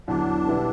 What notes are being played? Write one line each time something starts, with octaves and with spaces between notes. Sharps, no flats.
E2 D3 F#3 D4
B2 G3 B3 E4